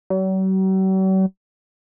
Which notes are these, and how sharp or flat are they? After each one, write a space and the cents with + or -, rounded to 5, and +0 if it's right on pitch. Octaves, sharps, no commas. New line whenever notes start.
F#3 +45